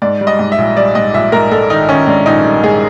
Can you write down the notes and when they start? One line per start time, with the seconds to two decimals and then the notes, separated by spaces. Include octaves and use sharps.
0.02 G#2 D5
0.21 G3
0.27 D#5
0.39 G#2
0.52 E5
0.58 A#1
0.77 G3 D5
0.95 G#2 D#5
1.14 A#1 E5
1.32 G#2 A#4
1.51 G#2 A4
1.70 D#3 D#4
1.89 D#3 C#4
2.07 G#2 D4
2.26 A#1 D#4
2.45 G3
2.63 G#2 G#4